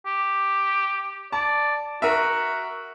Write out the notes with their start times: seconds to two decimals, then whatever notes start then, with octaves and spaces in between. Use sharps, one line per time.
0.06 G4
1.32 D5 A5
2.02 F#4 A#4 E5